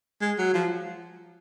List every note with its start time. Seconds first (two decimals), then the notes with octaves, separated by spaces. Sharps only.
0.21 G#3
0.38 F#3
0.54 F3